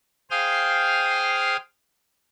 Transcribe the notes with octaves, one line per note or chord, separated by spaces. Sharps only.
G#4 C5 F5 G5 D#6 F6